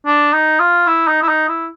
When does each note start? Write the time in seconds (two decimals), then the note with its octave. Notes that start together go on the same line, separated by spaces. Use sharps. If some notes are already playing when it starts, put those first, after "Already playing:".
0.06 D4
0.32 D#4
0.60 F4
0.87 E4
1.08 D#4
1.22 E4
1.28 D#4
1.48 E4